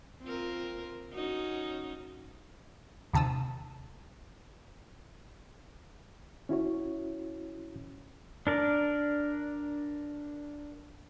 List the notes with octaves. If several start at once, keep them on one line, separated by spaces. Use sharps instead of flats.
C4 F4 A#4
C#4 D#4 F#4
D#2 C3 A5 D#6 E6
C#4 E4 F#4 C#5
D4 A#4 D5